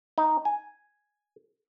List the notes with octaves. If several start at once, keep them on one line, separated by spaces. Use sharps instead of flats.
D#4
G#5